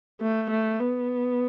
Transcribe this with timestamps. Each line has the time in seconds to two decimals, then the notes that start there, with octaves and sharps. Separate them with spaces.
0.21 A3
0.50 A3
0.79 B3